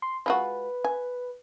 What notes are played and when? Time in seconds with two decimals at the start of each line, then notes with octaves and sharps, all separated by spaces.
0.02 C6
0.26 G#3 F4 F#4 B4
0.85 G#5